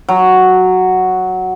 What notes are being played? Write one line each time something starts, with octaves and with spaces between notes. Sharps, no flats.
F#3